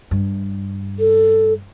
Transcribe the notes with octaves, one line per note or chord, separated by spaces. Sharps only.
G2
A4